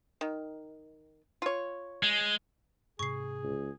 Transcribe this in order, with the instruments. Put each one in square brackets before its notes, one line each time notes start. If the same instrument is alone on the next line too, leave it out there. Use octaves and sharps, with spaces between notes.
[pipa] D#3
F4 C#5
[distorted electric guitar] G#3
[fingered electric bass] G#2 C3 [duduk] G#4 [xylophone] C#6 C7
[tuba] C#2